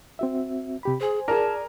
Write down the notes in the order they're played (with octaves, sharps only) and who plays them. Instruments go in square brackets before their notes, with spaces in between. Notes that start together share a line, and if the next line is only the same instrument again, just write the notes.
[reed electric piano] C4 F#4 E5
C3 G4 B5
[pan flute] G#4 [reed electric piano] C5 G#5
[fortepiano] G#4 A#4 [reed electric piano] D5 [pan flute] A5